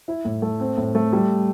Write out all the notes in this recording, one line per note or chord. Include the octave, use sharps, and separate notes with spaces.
E4
A2
A3
C4
A2
A3
G3